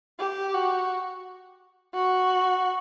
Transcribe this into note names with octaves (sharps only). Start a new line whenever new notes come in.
G4
F#4
F#4